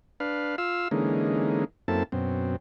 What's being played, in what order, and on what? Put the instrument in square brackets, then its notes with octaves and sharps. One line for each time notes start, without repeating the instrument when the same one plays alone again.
[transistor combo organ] D4 B4 F5
F4 F5 E6
D3 E3 G#3 A#3 C#4 D#4
F#2 A#3 C4 E4 A4 A5
F#2 B2 C4